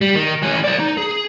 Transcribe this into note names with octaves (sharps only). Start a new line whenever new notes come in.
G3
D#3
E3 C#4
C5 D5
D#4
G#4